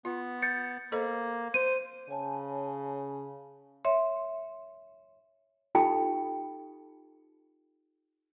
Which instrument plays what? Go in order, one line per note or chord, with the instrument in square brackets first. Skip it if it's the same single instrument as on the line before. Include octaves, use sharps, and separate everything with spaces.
[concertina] B3 [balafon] F4
[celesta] G6 A6 C#7
[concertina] A#3 [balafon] A4 C5 D#5
[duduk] C5 [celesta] D#7
[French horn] C#3 [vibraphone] C#5 G#5 A5
[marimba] C#5 E5 C6
[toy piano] D#4 F4 G4 A4 G5 B5